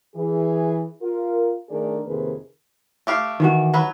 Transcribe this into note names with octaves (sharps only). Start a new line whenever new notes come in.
E3 G#4
F4 A#4
D#3 A3 D4 G#4 A#4 D5
F2 C3 D#3 A#3 G#4 B4
A3 G4 F5
D#3 E3 F#4
F#3 B4